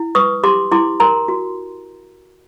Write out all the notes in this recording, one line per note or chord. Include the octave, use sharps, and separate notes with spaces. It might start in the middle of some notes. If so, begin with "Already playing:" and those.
Already playing: E4
B4 C#6 D#6
G4 C6 D6
E4 C6 D6
A#4 A#5 C6
F#4